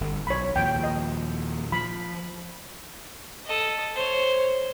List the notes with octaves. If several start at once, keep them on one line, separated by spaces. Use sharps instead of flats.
G1
B1 C#5 B5
D#2 A#2 F3 G5
D#5
F3 B5
A4 D#5
C5 C#5